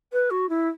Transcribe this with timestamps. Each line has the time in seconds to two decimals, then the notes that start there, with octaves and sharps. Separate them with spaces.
0.12 B4
0.30 F#4
0.49 E4